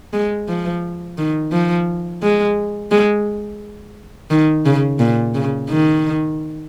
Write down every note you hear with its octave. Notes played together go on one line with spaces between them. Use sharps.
G#3
F3
D#3
F3
G#3
G#3
D#3
C#3
A#2
C#3
D#3